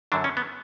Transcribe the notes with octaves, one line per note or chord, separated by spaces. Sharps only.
F#2 D3 F#3 D4
C#4
B3